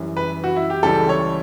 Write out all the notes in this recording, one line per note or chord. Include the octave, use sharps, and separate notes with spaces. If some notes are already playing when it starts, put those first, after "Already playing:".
Already playing: F#2 E3 G3
B4
F#4
E4
G4
C#2 C#3 E3 G3 A4
C#5